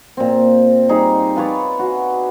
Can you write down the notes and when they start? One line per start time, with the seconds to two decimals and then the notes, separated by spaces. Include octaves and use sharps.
0.17 A#2 C4
0.89 G3 D#4 G#4
1.36 F4 B4 C#5 D5
1.79 F#4